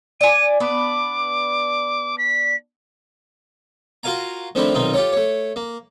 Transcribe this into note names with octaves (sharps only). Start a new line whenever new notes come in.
D5 G#5 D#7
B3 D4 B4 D6
B6
F4 F#4 A#4 F5 G#5 A#5
D#3 F3 A3 C4 D4 E4
B1 D#3 C4 D#4 F4
F4 G4 A4 C#5
A3 C#5
A#3